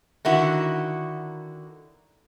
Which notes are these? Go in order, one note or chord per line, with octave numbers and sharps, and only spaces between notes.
D3 D#3 E4 F#4